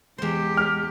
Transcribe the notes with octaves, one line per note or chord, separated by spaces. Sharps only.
E2 G#3 G4 C5
F6